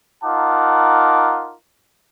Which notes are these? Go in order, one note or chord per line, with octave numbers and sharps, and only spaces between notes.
D#4 F4 A#4 F#5 A5 D6